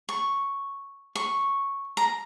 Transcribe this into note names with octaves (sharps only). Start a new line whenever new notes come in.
C#6
C#6
A#5